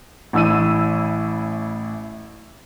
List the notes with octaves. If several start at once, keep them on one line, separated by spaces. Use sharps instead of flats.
A1 E4 E6 D#7